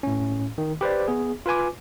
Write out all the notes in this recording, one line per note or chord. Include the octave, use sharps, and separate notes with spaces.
A2 C#4
D#3
G4 B4 C5 D5
B3 G#4
F4 B4 G#5 D6